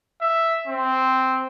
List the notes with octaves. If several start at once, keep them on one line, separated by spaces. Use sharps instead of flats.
E5
C4